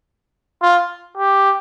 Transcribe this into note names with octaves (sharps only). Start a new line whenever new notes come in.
F4
G4